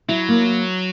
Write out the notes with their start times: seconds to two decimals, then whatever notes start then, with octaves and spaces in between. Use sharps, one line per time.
0.09 F#3 E4
0.29 A#3